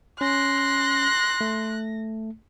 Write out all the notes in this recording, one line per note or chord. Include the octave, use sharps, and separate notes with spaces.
C#4 C6 F#6 A#6
A3